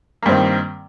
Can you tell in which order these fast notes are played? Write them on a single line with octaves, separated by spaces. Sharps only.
A#3 G2 C4 D#3